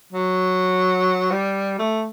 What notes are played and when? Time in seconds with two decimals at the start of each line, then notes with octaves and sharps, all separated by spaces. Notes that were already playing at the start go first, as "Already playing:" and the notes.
0.13 F#3
1.31 G3
1.79 A3